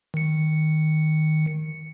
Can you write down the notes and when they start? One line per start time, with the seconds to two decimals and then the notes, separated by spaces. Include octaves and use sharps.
0.14 D#3 C#7